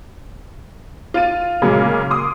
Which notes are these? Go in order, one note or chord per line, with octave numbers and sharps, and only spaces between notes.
F4 A6 D#7
A#2 C#3 F#3 G#3 A#3
C6 D6 D#6